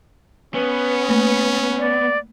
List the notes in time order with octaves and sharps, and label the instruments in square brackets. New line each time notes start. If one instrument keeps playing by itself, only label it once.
[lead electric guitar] B3 [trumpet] C#4
[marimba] A3 A#3
[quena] D5